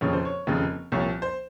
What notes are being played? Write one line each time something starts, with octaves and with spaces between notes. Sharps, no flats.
F1 D#2 C#3 F3 C#5
C5
C#5
F1 D#2 C#3 F3
C2 A#2 F3 C#5
C5